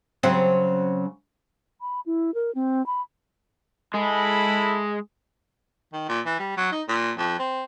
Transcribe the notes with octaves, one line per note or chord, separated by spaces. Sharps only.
C#3 F#3 C4
B5
E4
A#4
C4
B5
G#3 E4 G#4 A4 B5
D#3
A#2
E3
G3
F#3
D#4
A#2
F2
C4